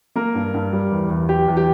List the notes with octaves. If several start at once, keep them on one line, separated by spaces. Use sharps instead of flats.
A#3 A#4
G2
G2
G3
E2
E2
F#3 G4
E2
G4